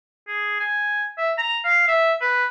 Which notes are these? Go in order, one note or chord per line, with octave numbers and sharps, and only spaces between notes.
G#4
G#5
E5
A#5
F5
E5
B4